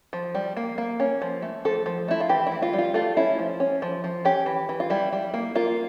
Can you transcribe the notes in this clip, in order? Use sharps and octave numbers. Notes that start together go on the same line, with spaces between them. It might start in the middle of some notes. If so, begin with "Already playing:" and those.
F3
G3
A#3
A#3
C#4
F3
A3
F3 A4
F3
A3 E4
F4
E3 G4
E4
E3
F4
G3
F4
A3 F4
C#4 E4
F3
C#4
F3
F3
C#4 G4
E3
E3
F4
G3 E4
G3
A#3
A#3 F4